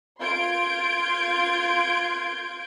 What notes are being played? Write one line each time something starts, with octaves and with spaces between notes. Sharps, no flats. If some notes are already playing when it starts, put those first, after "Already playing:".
F4 C6 G6 G#6 D7